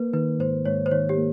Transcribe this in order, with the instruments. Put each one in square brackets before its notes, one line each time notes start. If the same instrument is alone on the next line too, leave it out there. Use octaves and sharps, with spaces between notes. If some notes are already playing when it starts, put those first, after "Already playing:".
Already playing: [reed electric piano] A#3 [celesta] B4
[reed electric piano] D#3 [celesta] B4
[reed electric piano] G#2 [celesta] C5
[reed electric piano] G#2 [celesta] C#5
[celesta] C5
[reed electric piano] D#3 [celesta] C#5
[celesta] G4
[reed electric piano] A#3